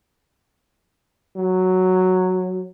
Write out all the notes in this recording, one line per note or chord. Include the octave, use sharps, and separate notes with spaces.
F#3